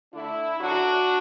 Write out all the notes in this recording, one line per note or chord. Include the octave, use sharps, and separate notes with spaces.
D3 A3 D4 E4
F#2 D3 F#3 D4 F#4